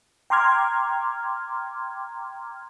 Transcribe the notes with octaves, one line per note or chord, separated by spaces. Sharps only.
G5 A#5 C6 D6 F6 G#6